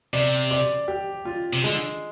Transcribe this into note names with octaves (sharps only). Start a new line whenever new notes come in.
C3 D5
D5
G4
F4
C3
D3 G#3